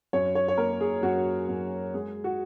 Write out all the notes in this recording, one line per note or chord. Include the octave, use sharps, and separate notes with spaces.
F#2 C#5
C#5
C#5
A#3 A#4
G#4
F#2 F#4
F#2
G#3 G#4
F#4